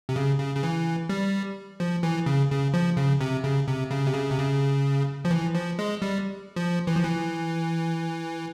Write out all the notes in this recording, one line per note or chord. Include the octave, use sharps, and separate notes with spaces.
C3
C#3
C#3
C#3
E3
G3
F3
E3
C#3
C#3
F3
C#3
C3
C#3
C3
C#3
C3
C#3
C3
C#3
F3
E3
F3
G#3
G3
F3
E3
F3
E3